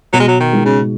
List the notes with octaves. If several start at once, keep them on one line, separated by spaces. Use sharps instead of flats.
B2 F#3
G#3
F#3
D#3
G#3 D#4
C#3